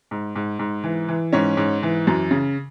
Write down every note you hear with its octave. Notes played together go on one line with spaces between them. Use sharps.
G#2
G#2
G#2
E3
E3
G#2 C#4 C#5
G#2
E3
F#2
C#3